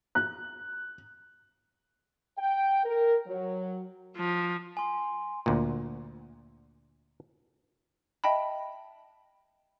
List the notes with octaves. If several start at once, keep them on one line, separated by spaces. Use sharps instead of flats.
F#6
G5
A#4
F#3
F3
G#5 C6
D2 A#2
D#5 E5 G5 A5 B5